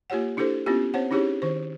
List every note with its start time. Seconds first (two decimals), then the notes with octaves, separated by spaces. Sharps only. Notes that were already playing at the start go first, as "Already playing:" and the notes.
0.10 A#3 F4 G4 C#5 F#5
0.37 D4 E4 G4 A4 C5
0.66 B3 C#4 E4 F4 G4
0.94 C4 C5 C#5 F#5
1.11 C#4 D#4 E4 G4 G#4 C#5
1.42 D#3 C5